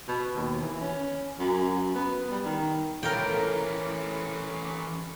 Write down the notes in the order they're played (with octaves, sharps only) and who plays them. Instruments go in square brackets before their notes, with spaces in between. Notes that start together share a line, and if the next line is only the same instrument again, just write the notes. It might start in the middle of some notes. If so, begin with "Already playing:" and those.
[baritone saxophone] B2
D#2
E3
C#4
F#2
B3
G3
D#3
[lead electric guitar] E3 C#4 [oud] A3 F4 [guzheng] A#4 G5